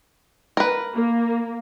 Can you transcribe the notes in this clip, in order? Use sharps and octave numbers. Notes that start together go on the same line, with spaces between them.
A#4 B4
A#3